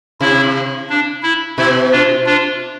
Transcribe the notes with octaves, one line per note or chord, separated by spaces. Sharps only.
C3 E4
D4
E4
B2 E4
D4 F4
D4 F4